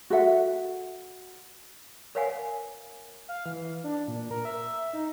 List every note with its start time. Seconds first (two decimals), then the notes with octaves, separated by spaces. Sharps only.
0.10 F#4 A4 E5 F#5
2.15 A#4 B4 C#5 F5 F#5 G#5
3.29 F5
3.46 E3
3.84 D4
4.08 A#2
4.31 A#4
4.45 E5
4.93 D#4